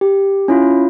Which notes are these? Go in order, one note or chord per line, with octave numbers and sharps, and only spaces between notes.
G4
C#4 E4 F4